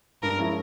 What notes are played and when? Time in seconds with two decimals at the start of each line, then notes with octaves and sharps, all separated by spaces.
0.22 G2 A#4
0.38 F3 G#3 C#4 E4